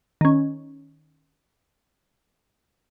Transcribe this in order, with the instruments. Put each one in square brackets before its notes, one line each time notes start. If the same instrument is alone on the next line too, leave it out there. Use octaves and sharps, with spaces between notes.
[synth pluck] D#3 C#4